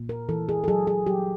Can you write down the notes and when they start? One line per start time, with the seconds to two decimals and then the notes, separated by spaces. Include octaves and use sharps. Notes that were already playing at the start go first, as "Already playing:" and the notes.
Already playing: A#2
0.09 A#4
0.29 E3 A4
0.49 G#4
0.64 A4
0.68 F#3 G#4
0.87 G#4
1.07 F#3 G4